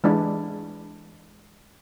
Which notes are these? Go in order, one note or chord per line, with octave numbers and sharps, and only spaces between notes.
E3 G#3 D4 E4